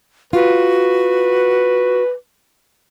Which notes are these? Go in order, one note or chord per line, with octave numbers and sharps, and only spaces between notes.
F4 F#4 B4